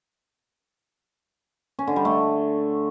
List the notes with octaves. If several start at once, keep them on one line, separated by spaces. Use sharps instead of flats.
C#4
D3
G3
A3